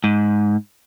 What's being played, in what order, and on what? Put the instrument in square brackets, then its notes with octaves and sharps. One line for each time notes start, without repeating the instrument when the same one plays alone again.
[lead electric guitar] G#2